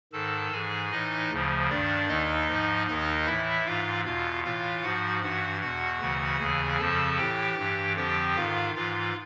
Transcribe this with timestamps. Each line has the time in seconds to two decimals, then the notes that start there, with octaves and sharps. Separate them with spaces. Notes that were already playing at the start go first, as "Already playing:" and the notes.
0.13 G#2 D#3 A4 A5
0.52 G#2 E3 G#4 G#5
0.91 A2 E3 D#4 D#5
1.30 D2 C#3 F3
1.69 G2 D#3 D4 D5
2.08 D#2 D#3 D#4 D#5
2.48 G#2 F3
2.87 D#2 D#3 D#4 D#5
3.26 A2 E3 E4 E5
3.65 G#2 E3 F4 F5
4.04 E2 B2 F4 F5
4.43 A2 E3 F4 F5
4.83 G#2 F3 F#4 F#5
5.22 G2 E3 F#4 F#5
5.61 E2 B2 F#4 F#5
6.01 D2 C#3 E3
6.39 D#2 C#3 E3 G#4 G#5
6.79 F2 C#3 F3 A4 A5
7.18 A2 E3 G4 G5
7.58 G2 E3
7.96 F2 D3 F3 G4 G5
8.36 G#2 D#3 F4 F5
8.74 G#2 E3 F4 F5